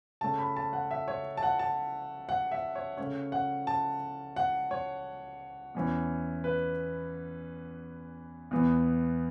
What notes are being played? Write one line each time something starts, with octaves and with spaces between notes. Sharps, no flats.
C#3 A3 C#4 A5
B5
A5
F#5
E5
C#5
A5
F#5
A5
F#5
E5
C#5
C#3 A3 C#4 C#5
F#5
A5
F#5
C#5
E2 E3 C#4
B4
E2 E3 B3